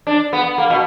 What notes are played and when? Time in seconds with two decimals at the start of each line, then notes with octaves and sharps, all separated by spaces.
0.07 D4
0.33 B3
0.58 A#3
0.70 B2